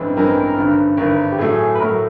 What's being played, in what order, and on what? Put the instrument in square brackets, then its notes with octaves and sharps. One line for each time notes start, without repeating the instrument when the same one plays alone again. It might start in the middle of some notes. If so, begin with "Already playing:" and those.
Already playing: [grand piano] A1 G2 E3 G#3 C4
[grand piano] A1 G2 E3 G#3 C4 [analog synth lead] A#4
[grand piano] G#1 G2 D3
[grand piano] G#1 G2 D3 [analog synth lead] A#4
[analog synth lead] G4
[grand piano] A2 F#3 A3 [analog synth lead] G#4
[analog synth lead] B4
[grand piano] A2 F#3 A3 [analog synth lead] A#4